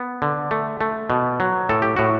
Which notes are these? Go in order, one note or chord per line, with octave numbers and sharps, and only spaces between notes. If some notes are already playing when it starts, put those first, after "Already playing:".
Already playing: B3
D3
A3
A3
B2
F#3
A2 A4
G4
A2 F#4